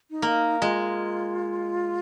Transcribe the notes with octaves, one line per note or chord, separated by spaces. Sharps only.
D#4
A#3
G#3 F4